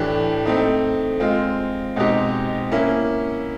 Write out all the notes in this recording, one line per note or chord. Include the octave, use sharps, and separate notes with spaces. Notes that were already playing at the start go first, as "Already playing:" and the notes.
Already playing: A2 E3 A3 D4 G4
A3 C4 D#4
G#3 C4 F4
B2 G#3 C4 D#4 G4
A#3 C#4 E4